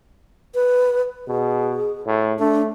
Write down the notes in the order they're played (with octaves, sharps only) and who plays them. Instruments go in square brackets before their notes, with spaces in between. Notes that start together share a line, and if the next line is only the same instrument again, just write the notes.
[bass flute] B4
[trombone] B2 [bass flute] G#4
[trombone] A2
[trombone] A3 [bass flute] D4